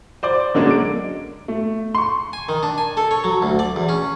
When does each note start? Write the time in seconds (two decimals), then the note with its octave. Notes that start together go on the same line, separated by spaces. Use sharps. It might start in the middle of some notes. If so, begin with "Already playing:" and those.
0.23 C5 D5 D6
0.54 D3 F#3 G#3 A#3 C#4 D4
0.70 D7
1.48 A3
1.95 C6 C#6
2.33 G#5
2.49 D#3
2.63 D4
2.78 G#5
2.97 A4
3.11 C#5
3.24 F#3
3.42 D2
3.59 D5
3.76 E2
3.89 C#4